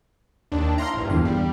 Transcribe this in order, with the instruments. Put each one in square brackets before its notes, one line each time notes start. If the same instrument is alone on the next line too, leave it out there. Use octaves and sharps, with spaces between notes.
[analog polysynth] D#2 D4
[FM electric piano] E4 F5 [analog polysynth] A#5 C6
[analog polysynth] A#1 G2
[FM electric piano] E2 D3 F5
[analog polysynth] G3